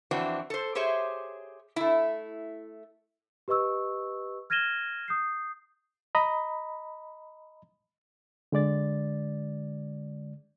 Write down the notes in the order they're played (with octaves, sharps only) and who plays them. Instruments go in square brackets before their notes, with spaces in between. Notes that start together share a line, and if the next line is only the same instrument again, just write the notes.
[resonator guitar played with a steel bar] F2 E3 C4 D4 F#4
A4 C5
G4 G#4 C5 C#5 E5
A3 E4
[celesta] G4 B4 D#5 C#6 E6
F6 G#6 A#6 D#7 E7 G7
D#6 G6 C7
[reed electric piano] D#5 A#5 B5
D3 G#3 D5 A6